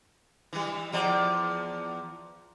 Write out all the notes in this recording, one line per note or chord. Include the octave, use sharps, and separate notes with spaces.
E3 G3
E2 F3 D5